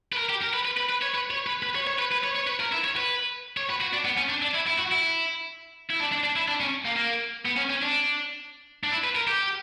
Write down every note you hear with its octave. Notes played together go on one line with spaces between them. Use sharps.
B4
A#4
G4
A#4
B4
B4
B4
B4
C#5
B4
C#5
B4
B4
C#5
C#5
B4
B4
C#5
C#5
B4
A#4
E4
C#5
B4
C#5
B4
F#4
D4
B3
C#4
D4
D4
E4
E4
F#4
E4
E4
D4
D4
D4
E4
D4
C#4
A#3
A#3
B3
C#4
C#4
D4
D4
E4
B4
A#4
G4